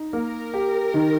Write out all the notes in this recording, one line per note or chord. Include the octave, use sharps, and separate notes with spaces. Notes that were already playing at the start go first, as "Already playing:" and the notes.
Already playing: D#4
A#3 A#4
G4
D#3